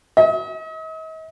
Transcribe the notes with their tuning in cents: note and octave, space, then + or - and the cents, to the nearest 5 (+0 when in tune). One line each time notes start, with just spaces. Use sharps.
D#5 +40